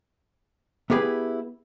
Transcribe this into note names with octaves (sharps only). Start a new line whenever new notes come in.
B3 E4 G4 G#4 B4